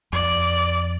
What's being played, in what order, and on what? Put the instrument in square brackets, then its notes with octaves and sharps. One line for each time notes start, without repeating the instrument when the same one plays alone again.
[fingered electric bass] F2 [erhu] D5